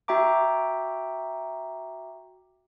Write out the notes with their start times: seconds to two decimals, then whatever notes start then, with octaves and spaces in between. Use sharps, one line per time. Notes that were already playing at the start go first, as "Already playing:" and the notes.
0.08 F#4 E5 G5 A#5 D6